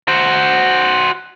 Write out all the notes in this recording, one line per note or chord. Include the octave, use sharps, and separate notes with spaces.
F#4 C5